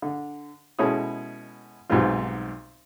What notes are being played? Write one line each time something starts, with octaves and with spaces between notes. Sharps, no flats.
D3
B2 G#3 C#4 E4 A4 D#6
B1 G#2 F#3 G3 C4 F4